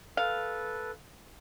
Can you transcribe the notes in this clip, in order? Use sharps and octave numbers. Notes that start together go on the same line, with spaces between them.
A4 B4 F5